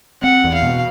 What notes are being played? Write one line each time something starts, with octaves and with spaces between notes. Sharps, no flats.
C4 F#5
E2
F5
B2